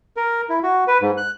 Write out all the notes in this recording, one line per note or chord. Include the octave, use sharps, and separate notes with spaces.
A#4
E4
F#4
B4
G#2
F#6